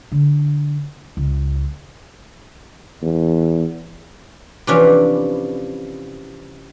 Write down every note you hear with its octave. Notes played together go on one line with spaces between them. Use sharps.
D3
C#2
E2
C3 E3 F3 C#4 D4 B4